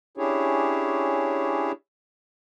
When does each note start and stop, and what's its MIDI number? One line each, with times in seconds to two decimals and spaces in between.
0.17 1.72 61
0.17 1.72 62
0.17 1.72 64
0.17 1.72 67
0.17 1.72 68
0.17 1.72 73